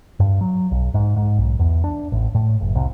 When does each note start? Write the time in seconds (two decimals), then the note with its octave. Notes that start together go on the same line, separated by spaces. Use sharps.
0.20 G2
0.41 F#3
0.71 B1
0.94 G#2
1.16 G#2
1.38 B1
1.59 E2
1.84 D4
2.12 A1
2.35 A2
2.61 F#1
2.75 C2